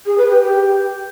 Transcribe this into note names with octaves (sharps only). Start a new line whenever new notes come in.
G#4
B4
G4
G4